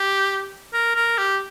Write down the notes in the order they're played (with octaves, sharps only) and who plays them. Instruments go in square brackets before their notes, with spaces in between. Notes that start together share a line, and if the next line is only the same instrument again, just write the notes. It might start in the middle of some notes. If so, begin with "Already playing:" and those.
Already playing: [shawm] G4
A#4
A#4
G4